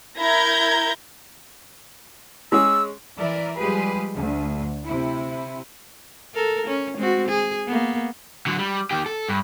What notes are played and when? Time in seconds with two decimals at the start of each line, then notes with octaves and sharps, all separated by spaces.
0.19 E4 A#4 A#5 G6 G#6 A#6
2.52 G#3 C#4 G#4 E6
3.18 E3 A#4 D5 E5
3.58 F3 G3 G#3 G4 G#4 B4
4.14 D2
4.85 C3 E4
6.34 A4 A#4
6.67 C#4
6.97 G#3 C4 F#4
7.28 G#4
7.67 A#3 B3
8.47 D3 F#3
8.58 G3
8.91 D#3 G4
9.06 A4
9.29 G2